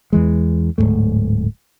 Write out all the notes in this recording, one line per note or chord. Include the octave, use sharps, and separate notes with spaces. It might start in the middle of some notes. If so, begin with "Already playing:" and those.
E2 E3 G#3
D1 E2 G#2 A3